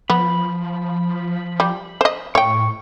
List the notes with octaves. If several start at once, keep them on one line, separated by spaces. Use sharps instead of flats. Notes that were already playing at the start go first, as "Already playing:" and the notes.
F3 B3 B5
G3
C5 D#5
A2 C#5 G5 C#6